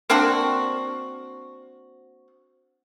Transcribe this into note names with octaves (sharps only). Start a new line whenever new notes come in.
A#3 C4 D4 F#4